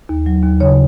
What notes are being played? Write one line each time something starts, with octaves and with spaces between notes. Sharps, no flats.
D#2
F#3
D#2
C#3 C#5